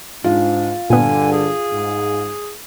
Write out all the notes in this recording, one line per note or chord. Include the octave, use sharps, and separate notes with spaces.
G#2 D4 F4
G2 A#2 D3 B3 G#5
G#4
G#2